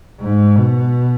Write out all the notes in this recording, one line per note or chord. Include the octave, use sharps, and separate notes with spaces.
G#2
B2